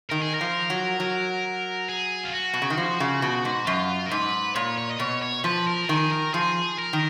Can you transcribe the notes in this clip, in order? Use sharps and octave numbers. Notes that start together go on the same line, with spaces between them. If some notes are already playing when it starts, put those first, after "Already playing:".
D#3 A#4
G#4
A#4
F3
F#3
F#3
G#4
F4
F#4
B2
C#3
D#3
F3
C#3
B2
G#2
F#2 F4
A#4
G#2 B4
A#2 C#5
C#5
D#5
B2 C#5
C#5
F3 B4
A#4
D#3 G#4
A#4
F3 G#4
A#4
D#3